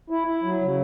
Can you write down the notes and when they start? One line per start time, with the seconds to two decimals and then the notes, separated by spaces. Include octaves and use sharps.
0.10 E4
0.27 E4
0.44 F#3
0.61 C#3